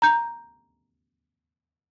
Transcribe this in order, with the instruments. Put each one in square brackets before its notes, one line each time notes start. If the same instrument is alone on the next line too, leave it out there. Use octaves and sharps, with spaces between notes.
[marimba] A#5 G6